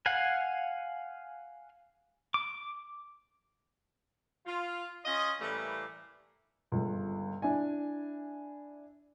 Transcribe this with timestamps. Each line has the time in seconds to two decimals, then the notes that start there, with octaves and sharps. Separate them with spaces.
0.06 F5 F#5 G#5
2.34 D6
4.46 F4
5.05 C#4 F4 D#5
5.41 A2 E3 G3 A3 A#3
6.72 G1 C#2
7.42 D4 E4 G#5